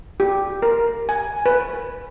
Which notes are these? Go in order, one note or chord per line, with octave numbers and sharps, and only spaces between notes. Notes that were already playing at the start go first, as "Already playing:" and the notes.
G4
A#4
G#5
B4